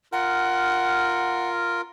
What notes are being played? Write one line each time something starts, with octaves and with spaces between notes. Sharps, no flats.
F4 A#4 F#5